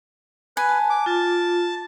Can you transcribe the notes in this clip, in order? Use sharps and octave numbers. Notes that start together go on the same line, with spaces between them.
B4 G#5
A5
D6
F4 A5